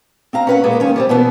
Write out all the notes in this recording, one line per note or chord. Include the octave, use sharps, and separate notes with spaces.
C4 F5 A#5
C#4 B4 F#5
A#2 G#3 A#3
D#3 C#4
G3 A#3 C4
B2 E3 B3